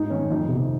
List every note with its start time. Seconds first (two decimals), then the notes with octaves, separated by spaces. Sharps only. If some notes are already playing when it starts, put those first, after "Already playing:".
Already playing: G#2 D#4
0.10 D#3 C#4
0.30 F2 D#4
0.48 C3 D#3